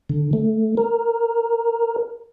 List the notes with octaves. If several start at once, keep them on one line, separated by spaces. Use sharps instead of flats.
D3
A3
A#4